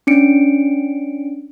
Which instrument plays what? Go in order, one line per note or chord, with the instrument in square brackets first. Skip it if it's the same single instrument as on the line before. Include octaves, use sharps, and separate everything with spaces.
[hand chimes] C#4 D4 C#7 D7